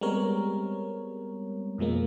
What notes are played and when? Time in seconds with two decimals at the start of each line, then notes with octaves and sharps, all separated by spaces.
0.01 G3 G#3 B3 C4 A#4 C#5
1.78 F2 B2 F3 G#3 A#3